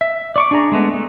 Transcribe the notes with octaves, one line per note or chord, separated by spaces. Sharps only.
E5
D5 C#6 D6
D4 G#4 A#5
G#3 A3 B3
A3